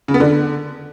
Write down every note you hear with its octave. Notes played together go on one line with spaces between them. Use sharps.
C#3
B3
D3